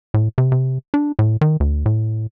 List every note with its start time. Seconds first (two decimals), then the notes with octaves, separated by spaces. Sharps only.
0.14 A2
0.38 C3
0.52 C3
0.94 D4
1.19 A2
1.41 D#3
1.60 D2
1.86 A2